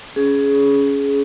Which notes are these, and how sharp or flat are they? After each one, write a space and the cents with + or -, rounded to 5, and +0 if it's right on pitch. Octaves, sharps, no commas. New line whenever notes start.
C#4 +15 G#4 +15